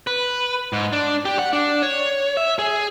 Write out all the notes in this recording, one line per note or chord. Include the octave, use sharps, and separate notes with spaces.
B4
G#2
D4
G4
F#5
D4
C#5
E5
G#4